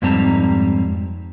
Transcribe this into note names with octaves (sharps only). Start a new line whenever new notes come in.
F2 G#2 G3 C4 A5 A#5